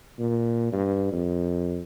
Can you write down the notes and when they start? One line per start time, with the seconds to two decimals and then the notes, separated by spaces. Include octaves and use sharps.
0.19 A#2
0.73 G2
1.13 F2